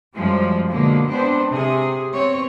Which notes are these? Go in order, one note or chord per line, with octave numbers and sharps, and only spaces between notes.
F#2 F3 G3 G#3
B2 D3 F3 G#3 A#3
G#3 B3 C4 D4 C5
C3 G#4
B3 C4 C#5